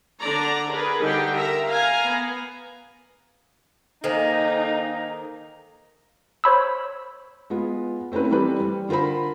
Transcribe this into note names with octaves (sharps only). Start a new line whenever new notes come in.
D3 D4 D5 A#5
G#4 A#4 B4
D3 G3 D#4 G4 G5
A#4 E5 A#5
F5 G#5 A#5
B3
D#3 A#3 D#4 A4 C5 G#5 A#5
C5 C#5 B5 E6
G#3 B3 F4
A3 C4 C#4 E4 B4
E3 G3 C4 G4 A4 B4
G3
D3 F4 A#4 C5 B5